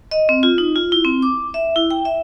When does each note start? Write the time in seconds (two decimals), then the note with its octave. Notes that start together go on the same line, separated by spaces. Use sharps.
0.11 D#5
0.29 C4
0.43 F4
0.58 D#4
0.76 F4
0.92 E4
1.05 C4
1.22 D6
1.54 E5
1.76 E4
1.91 G5
2.05 E5